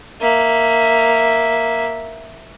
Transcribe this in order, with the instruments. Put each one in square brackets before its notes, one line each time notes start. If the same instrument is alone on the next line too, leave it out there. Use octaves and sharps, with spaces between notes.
[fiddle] A#3 E5